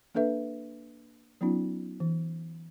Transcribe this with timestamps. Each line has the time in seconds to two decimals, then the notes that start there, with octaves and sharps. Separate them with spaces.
0.15 A#3 D4 A4 B4 E5
1.41 F#3 B3 C#4 D#4 F4
2.00 E3